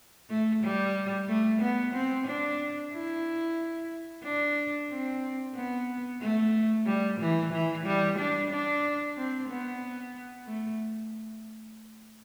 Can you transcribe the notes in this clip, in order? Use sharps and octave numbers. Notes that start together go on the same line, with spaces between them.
A3
G3
A3
B3
C4
D4
E4
D4
C4
B3
A3
G3
E3
E3
G3
D4
D4
C4
B3
A3